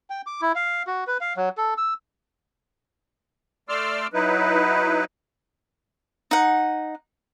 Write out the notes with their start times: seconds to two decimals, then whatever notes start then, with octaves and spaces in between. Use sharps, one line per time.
0.10 G5
0.27 D6
0.41 E4
0.56 F5
0.87 F#4
1.07 B4
1.21 F5
1.37 F#3
1.57 A4
1.77 E6
3.69 A3 D5 C6 D6 E6 F6
4.13 F#3 D#4 E4 B4
6.31 D#4 F#5